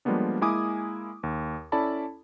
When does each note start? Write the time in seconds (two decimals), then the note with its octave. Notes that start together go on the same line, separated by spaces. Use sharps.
0.05 F3 G3 G#3 A#3 B3 D4
0.41 G#3 A#3 E4 G#5 D6 D#6
1.23 D#2
1.72 C#4 E4 A4 D5 A5 B5